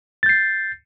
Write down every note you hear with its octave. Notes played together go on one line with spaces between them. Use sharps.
G6 A6 C7